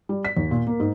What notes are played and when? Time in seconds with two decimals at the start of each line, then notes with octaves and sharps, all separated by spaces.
0.09 G3
0.25 B6
0.37 D#2
0.51 A#2
0.67 A#3
0.80 G#2